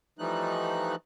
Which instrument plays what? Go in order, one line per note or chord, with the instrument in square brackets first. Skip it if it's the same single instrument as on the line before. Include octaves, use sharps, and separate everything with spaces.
[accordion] E3 F3 G3 A3 D#4 F#6